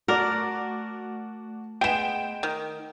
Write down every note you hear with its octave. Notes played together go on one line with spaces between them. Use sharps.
A3 F#4 A#4 D5
G#3 B3 G5 E7
D#3